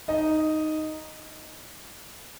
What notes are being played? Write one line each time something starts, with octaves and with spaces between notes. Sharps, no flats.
D#4 D#5